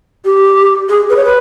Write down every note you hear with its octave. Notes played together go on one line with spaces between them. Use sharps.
G4
G#4
B4
C#5
B4